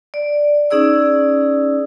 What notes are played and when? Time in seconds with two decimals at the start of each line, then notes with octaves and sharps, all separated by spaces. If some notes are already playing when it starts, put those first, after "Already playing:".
0.14 D5
0.71 C#4 D#4 G#4 D5 E6